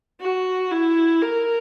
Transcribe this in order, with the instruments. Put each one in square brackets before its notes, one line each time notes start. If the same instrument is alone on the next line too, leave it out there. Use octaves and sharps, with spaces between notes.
[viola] F#4
E4
A#4